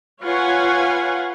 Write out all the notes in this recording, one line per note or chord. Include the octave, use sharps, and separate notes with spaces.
F4 B4 C#5 F5 F#5 G#5